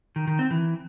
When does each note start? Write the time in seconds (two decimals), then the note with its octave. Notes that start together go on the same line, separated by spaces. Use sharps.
0.16 D#3
0.27 D#3
0.39 C4
0.51 E3